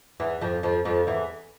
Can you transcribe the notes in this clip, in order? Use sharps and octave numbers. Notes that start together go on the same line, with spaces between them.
E2 E3
F2 F3
F2 F3
F2 F3
E2 E3